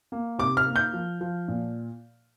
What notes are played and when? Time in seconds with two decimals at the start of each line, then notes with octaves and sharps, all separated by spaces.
0.12 A#3
0.38 C3 D6
0.57 F6
0.66 A#3
0.76 G6
0.93 F3
1.21 F3
1.48 A#2